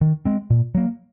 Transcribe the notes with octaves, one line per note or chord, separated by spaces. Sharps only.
D#3
G#3 C4
A#2
F#3 A#3